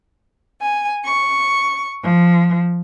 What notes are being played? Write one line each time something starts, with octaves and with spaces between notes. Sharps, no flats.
G#5
C#6
F3